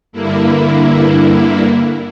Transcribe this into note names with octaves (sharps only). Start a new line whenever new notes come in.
G2 D3 A#3 E4